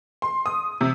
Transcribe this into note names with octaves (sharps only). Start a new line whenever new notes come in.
C6
D#6
C3